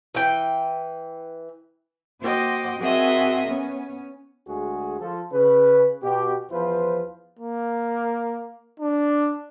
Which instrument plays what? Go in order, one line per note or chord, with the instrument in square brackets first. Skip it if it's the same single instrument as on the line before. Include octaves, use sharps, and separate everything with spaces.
[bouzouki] E3 G5
[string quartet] A#3 F#4 C5 D#5 G5 D6
C4 F#4 G#4 A#4 D#5 E5
B3 C#4
[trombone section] D2 G#3 F#4 G#4
F3 F4 A4
C#3 B4
B2 G4
E2 F3 F4 B4 C5
[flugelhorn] A#3
D4